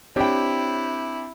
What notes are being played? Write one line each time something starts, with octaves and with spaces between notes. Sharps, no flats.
C4 D4 E4 G4 C#5 G5